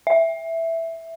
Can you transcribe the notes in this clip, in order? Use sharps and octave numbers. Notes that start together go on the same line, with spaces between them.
E5